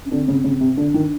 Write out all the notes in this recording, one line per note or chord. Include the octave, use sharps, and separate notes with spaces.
C#4
D3 C4
C#3
C#3
C3
D3 D4
D#3